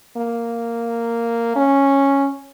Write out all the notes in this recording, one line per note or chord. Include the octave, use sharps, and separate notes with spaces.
A#3
C#4